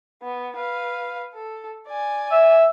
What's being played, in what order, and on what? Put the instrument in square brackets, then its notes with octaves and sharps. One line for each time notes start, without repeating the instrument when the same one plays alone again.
[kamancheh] B3
B4 F5
A4
D5 G#5
[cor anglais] E5